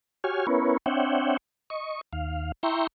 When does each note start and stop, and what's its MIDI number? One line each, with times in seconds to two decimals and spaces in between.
0.24 0.47 66
0.24 0.47 67
0.24 0.47 73
0.24 0.47 80
0.24 0.47 89
0.47 0.77 59
0.47 0.77 61
0.47 0.77 64
0.47 0.77 70
0.47 0.77 71
0.47 0.77 73
0.86 1.37 60
0.86 1.37 62
0.86 1.37 73
0.86 1.37 76
0.86 1.37 78
0.86 1.37 79
1.70 2.01 75
1.70 2.01 85
2.13 2.52 39
2.13 2.52 77
2.63 2.87 64
2.63 2.87 76
2.63 2.87 79
2.63 2.87 82
2.63 2.87 84
2.63 2.87 85